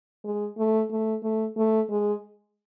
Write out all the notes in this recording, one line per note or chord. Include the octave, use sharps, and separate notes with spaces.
G#3
A3
A3
A3
A3
G#3